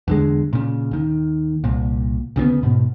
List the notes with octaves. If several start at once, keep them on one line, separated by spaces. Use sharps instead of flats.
E2 D3 G#3
A#2 C#3
D#2 D#3
C2 A#2
D2 C#3 F3 B3
G#2 B2